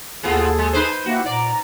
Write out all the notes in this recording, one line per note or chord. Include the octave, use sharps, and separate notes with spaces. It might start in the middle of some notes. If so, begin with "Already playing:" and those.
D#2 A2 B3 F4 G#4 A4
G#3
D#4 B4 C5
A#3 E4 F#4 G4
A#2 D5 A#5